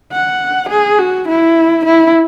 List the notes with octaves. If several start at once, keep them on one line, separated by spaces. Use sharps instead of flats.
F#5
G#4
F#4
E4
E4